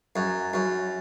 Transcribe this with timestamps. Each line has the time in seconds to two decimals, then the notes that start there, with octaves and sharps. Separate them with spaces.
0.16 F#2
0.54 F#2